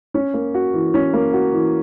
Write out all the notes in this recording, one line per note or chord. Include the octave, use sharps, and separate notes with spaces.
C#4
A#3
F#4
E3
C#4
A#3
F#4
E3